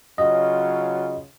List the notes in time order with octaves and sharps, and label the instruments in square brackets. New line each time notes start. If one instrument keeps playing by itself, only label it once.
[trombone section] C#3 F#3 F4 [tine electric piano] D#5